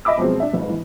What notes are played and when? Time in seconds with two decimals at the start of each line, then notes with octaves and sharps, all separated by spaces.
0.05 D#5 E5 B5 D6 E6
0.17 B2 F3 F#3 G#3 C4
0.40 D4 E5
0.53 G1 G#2
0.70 E3